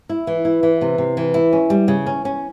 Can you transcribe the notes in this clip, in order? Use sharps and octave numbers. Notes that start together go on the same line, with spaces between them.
E4
E3
E4
E3
C3
C3
E3
E4
C#4
G3
C#3
C#4
C#4